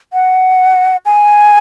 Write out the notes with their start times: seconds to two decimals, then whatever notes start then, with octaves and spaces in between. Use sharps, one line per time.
0.13 F#5
1.06 G#5